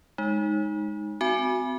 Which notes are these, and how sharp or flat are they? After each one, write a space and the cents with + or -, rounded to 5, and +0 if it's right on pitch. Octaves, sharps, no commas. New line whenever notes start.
G#3 +0 D#4 +0
C4 -35 F#4 +0 G#5 +0